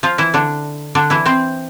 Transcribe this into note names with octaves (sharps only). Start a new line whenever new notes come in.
F3 F4
E3 E4
D3 D4
D3 D4
E3 E4
C4 C5